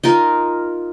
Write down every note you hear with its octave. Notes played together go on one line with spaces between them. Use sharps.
D#4 F4 A#4